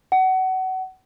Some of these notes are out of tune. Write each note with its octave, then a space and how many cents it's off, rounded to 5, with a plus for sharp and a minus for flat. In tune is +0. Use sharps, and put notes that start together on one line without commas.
F#5 +25